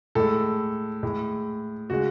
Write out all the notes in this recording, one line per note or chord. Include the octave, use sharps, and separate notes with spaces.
A2 G#3 A4
A2 G#3
C#3 G#3 F#4